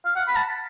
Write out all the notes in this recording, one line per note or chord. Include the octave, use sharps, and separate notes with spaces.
F5
F#5
B5
A5